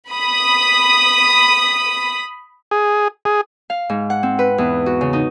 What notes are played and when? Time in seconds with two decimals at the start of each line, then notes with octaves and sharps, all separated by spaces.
0.11 B5 D#6
2.71 G#4
3.25 G#4
3.70 F5
3.89 G#2
4.10 F#5
4.23 C4
4.39 B4
4.58 E2
4.86 F#4
5.01 C#3
5.13 D#4